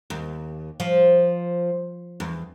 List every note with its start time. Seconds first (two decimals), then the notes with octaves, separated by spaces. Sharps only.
0.10 D#2
0.80 F3
2.20 E2